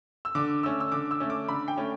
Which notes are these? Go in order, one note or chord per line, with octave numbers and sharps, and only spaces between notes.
E6
D3 D6
A3 C#4 E6
E6
D3 D6
E6
A3 C#4
D6
D3 B5
G5
A3 C#4